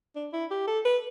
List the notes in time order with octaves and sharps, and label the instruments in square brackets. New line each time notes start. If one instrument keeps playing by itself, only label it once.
[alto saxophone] D4
E4
G4
A4
B4